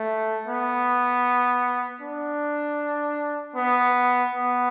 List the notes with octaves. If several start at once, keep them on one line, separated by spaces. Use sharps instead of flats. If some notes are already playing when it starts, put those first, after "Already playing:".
Already playing: A3
B3
D4
B3
B3